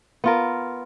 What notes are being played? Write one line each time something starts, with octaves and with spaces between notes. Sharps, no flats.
B3 F4 A#4